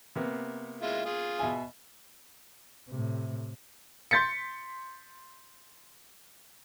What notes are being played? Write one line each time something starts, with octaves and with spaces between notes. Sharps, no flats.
C3 A#3 B3
G#3 E4 F4
F4 G#4
B2 E5 G#5
A2 C3
C6 G6 A6 B6 C#7